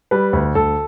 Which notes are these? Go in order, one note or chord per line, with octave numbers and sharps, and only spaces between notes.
G3 B4
D2
D2 A4